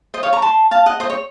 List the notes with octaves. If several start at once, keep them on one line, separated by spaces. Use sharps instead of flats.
C5 D#5
C#5 F5
A#5 C#6
A5 C6
F5 A5
D#5 F#5
C5 D#5
C#5